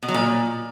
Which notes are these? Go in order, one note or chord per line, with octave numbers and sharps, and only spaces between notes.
B2
F#3
A#2